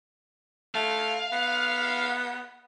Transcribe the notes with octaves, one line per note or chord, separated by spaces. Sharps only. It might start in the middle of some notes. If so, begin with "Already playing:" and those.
A3 F5
B3